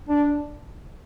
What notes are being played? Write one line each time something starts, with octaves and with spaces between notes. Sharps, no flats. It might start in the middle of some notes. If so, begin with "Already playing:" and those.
D4